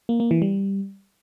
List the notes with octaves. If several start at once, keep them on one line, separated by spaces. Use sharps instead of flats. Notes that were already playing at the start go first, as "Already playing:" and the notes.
A#3
A#3
E3
G3